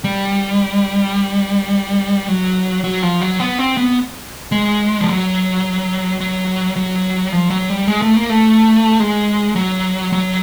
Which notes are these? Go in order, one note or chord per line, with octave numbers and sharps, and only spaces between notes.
G3
F#3
F#3
F3
F#3
B3
C4
B3
G#3
F3
F#3
F#3
F#3
F3
F#3
G3
G#3
A3
A#3
A3
G#3
F#3
F#3